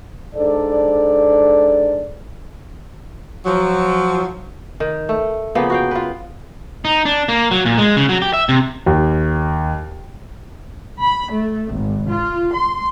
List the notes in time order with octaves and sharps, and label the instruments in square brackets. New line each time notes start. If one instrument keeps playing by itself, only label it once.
[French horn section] G#2 D4 A4 D5
[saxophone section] F3 F#3
[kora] D#3
A3
C#3 F3 A#3 B3
F#4 F5 G5
F4 B4
[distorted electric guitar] D#4
D4
A#3
F#3
A#2
G#3
C#3
F#3
G4
E5
C3
[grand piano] D#2
[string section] B5
A3
G#1
F4
C6